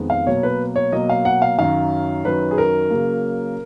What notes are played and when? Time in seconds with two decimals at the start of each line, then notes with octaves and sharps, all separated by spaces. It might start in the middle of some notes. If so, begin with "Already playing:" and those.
Already playing: F2 D#3 G#3 B3
0.10 F5
0.27 B2 F#3 A#3 C#5
0.43 B4
0.76 C#5
0.92 B2 F#3 A#3 D#5
1.09 F5
1.25 F#5
1.42 F5
1.58 F#2 D#3 F#3 F5
2.25 F#2 D#3 F#3 B4
2.51 G#4
2.58 A#4
2.90 C#3 F#3 A#3